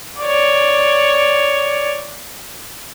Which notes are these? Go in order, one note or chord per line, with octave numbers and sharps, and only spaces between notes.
C#5 D5